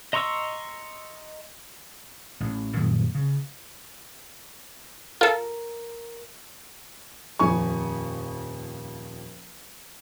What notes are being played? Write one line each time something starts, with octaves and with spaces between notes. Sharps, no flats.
D#5 A#5 C6 C#6 E6
A1
F#2 A#2 D#3 F3
C#3
F4 A4 A#4
D#1 F2 G#5 C#6